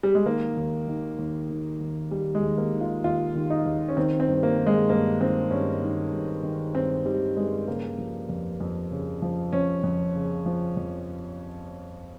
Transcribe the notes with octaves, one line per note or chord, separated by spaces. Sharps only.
G3
G#3
D#3 A#3
D#2
D#3
D#2
D#3
D#2
D#3 G3
G#3
D#2
A#3
D#3
F4
D#2 F4
D#3
D#4
D#2
C#4
D#3 C4
C4
G2
A#3
D#3
G#3
G2 A#3
D#3 C4
G2 C#4
D#3
G2
D#3
G2 C4
D#3 G3
G2 G#3
C#3 A#3
F3
F2
F2
C#3
F3
F2 C#4
F2
C#3
F3
F2